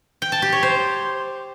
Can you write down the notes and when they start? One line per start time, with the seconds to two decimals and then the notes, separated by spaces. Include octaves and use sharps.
0.22 G5
0.32 A5
0.42 G4
0.52 C#5
0.63 C5